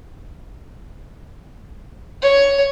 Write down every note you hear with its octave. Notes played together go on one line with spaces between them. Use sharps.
C#5